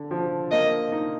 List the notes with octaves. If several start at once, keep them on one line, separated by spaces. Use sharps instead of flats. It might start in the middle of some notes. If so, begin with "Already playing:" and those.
Already playing: D3
F3
A#3 D#5
D#4